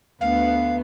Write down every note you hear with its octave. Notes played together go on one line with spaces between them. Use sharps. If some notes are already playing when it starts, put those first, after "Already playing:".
D2 B3 F5